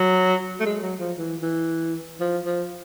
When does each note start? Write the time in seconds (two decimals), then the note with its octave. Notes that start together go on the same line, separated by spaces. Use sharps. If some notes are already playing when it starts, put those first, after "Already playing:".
Already playing: F#3
0.60 A3
0.66 G#3
0.83 F#3
1.00 F3
1.17 E3
1.42 E3
2.20 F3
2.45 F3